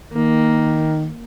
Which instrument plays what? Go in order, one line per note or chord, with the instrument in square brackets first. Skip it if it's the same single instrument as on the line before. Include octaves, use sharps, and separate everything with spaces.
[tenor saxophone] D#3 [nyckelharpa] A#3